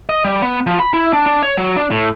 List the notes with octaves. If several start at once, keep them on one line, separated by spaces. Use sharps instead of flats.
D#5
G3
B3
F3
B5
E4
D4
D4
C#5
F#3
D4
A2